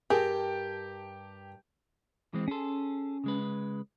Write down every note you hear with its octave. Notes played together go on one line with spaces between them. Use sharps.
G2 G4 G#4 A#4 G5 A5
E3 G#3 C4
C#4 G#4 A4 C6
C#3 G#3 B4